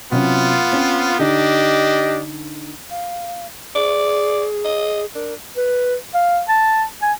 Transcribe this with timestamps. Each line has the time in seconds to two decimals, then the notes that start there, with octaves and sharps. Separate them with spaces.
0.12 C3 F#3 B3 C#4 F4
0.72 C4 C#4 C5
1.19 D3 D4 D#4 G4 D#5
2.90 F5
3.75 G#4 D5
4.65 D#5
5.15 D4 A#4
5.56 B4
6.14 F5
6.48 A5
7.02 G#5